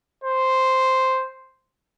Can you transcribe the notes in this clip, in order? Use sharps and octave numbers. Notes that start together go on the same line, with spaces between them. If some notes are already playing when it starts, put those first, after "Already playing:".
C5